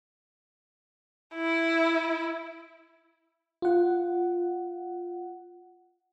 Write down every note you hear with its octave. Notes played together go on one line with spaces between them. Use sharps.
E4
F4 F#5